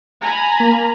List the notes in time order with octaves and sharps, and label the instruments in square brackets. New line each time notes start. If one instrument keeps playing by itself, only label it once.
[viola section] G#5 A#5 B5
[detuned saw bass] A#3